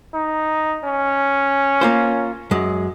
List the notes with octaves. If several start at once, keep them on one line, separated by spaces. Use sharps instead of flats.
D#4
C#4
A#3 F4 C5
F#2 G#3